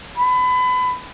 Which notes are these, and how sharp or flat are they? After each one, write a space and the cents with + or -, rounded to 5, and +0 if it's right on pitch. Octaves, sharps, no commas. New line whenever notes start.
B5 +30